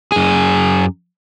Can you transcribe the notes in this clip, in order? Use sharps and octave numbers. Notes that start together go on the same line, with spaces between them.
F#2 G#4